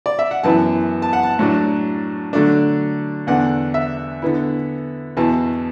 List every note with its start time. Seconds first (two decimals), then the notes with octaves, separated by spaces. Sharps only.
0.06 D5
0.19 E5
0.31 F#5
0.44 F#2 E3 B3 E4 A5
1.02 A5
1.13 F#5
1.23 A5
1.39 A2 F#3 D4
2.33 D3 F#3 A3 D4
3.27 E2 D3 B3 D4 F#5
3.74 E5
4.22 D3 B3 E4
5.17 E2 B2 B3 E4 A5